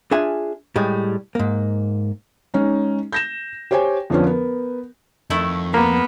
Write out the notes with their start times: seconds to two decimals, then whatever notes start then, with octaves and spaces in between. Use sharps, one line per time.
0.11 D4 F4 G#4 E5 G#5
0.76 A2 G3 G#3
1.35 G#2 A#3
2.54 G#3 C#4 D#4
3.12 G6 A#6 E7
3.71 G4 C5 C#5 G5 G#5
4.10 F2 D3 F3 B3 C#4
4.27 B3 A#4
5.30 F2 D#3 A3 E4
5.74 A#3 B3